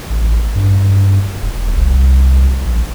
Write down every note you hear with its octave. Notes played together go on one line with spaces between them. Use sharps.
A1
G2
E1
C2
A#1